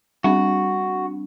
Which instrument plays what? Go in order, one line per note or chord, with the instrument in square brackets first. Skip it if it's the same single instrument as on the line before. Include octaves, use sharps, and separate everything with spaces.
[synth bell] G3 C4 D4 [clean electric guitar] F#4